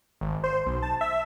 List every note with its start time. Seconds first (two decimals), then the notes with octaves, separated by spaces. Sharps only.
0.21 G#1
0.44 C5
0.66 B1
0.82 A5
1.01 E5